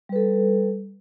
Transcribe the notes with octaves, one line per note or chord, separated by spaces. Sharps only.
G3 A4 B4